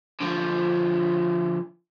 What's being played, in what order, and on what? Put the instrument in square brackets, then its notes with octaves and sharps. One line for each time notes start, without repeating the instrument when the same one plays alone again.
[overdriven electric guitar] D3 F3